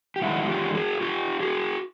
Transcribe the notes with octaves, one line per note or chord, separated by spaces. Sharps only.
G4
F#2 D#3 G#3 E4 F#4
F4 G4
F#4 G#4
F4 G4
F#4 G#4